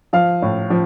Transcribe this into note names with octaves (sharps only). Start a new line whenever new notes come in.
F3 F5
A2
F3